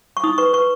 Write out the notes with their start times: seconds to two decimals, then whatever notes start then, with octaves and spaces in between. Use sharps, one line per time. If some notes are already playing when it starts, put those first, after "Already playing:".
0.17 C#6
0.24 D#4 D#6
0.38 B4 C#6
0.53 B4 C#6